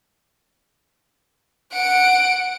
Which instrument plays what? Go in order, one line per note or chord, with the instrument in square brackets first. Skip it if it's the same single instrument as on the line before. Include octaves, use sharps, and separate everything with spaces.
[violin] F#5 D7